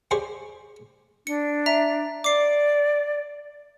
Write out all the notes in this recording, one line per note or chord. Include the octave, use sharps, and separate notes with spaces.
G4 G#4 C5 D5 B5 C#6
D4 C#7
E5 A#5
D5 D6 C7